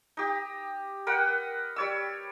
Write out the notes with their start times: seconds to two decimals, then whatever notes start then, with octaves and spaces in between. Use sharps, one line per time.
0.17 D#4 G4
1.07 A#4 B4 F#5 G5
1.76 G3 C#5 E6